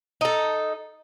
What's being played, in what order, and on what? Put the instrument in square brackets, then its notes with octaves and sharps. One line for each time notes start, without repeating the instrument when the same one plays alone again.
[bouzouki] D#4 A4